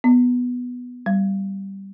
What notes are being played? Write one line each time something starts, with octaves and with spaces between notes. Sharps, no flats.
B3
G3